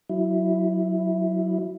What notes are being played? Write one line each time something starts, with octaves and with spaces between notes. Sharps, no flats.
F#3 E4